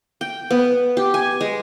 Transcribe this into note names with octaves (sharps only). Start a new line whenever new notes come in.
G5
B3
G4
G#5
G#3